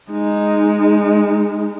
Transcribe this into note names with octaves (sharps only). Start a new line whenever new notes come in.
G#3 D#4